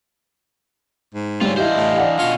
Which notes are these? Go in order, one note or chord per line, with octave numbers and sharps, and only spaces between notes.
G#2
D3 G3 C#4 F4
E3 D4 E4 G4 C5 D#5 F5
A2
D5 F#5
B2 C#4 F4